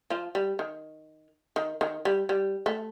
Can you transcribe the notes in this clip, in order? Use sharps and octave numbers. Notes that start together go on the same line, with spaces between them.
F3 F4
G3
D#3
D#3
D#3
G3
G3
A3